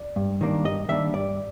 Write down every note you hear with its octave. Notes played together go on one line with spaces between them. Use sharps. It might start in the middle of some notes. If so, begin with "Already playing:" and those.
Already playing: D5
G2
D#3 G3 A#3 D4
G2 D#5
D#3 G3 A#3 D4 E5
G2 D5